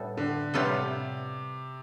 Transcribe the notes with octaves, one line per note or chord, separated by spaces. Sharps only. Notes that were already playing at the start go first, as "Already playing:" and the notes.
Already playing: A2 G3 B3 A4
D3
A2 C3 G3 B3 F4 A4